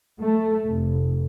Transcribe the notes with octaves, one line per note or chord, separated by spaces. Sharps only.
A3
F1